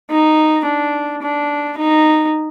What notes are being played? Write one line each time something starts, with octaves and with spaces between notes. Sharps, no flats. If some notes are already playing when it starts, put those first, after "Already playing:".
D#4
D4
D4
D#4